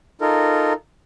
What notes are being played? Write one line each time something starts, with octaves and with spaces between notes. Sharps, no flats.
D#4 F4 A4 A#4